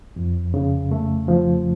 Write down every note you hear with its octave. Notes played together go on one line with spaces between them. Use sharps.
F2
C#3
A3
F3